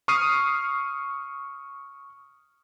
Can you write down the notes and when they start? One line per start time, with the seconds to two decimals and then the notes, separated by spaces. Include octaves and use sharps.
0.08 C#6 D#6 F6 C7 D#7